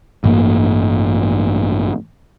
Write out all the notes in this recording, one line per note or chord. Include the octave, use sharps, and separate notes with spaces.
A1 G2 A#3